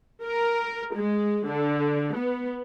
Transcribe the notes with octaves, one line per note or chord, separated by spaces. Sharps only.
A#4
G#3
D3
B3